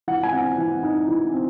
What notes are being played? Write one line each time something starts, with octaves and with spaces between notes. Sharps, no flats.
E3 F#5
G#5
C4 F#5
E3
D#4
E3
C4